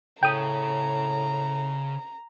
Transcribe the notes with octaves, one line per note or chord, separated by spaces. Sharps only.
A2 C#3 G5 A#5 D#6